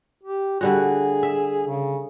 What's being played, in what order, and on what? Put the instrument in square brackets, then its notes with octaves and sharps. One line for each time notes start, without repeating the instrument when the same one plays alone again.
[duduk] G4
[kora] D3 G3 F#4 [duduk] G#4
[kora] E5
[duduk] C#3